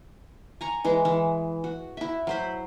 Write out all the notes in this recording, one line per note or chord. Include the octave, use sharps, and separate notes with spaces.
G#5 A#5 C#6
E3 G#3 G#4
E3
F#4
E4 E5
F#3 C5 B5